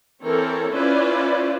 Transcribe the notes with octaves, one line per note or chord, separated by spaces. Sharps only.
E3 C4 A4 A#4 C#5
C#4 E4 F4 B4 C5 D5